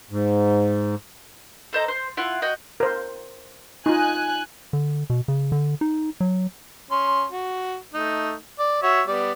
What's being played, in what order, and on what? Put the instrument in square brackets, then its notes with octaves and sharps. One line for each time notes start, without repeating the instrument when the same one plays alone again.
[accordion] G#2
[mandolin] A4 C5 D#5 A#5
C5
E4 F4 F#5
F#4 D#5 G5
[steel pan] A#4 C5
[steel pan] D#4 F4 [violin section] G#5 F#6
[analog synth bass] D3
B2
C#3
D3
D#4
F#3
[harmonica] C#4 C6
F#4
A3 D#4
D5
F#4 C#5 E5
G3 B3 D5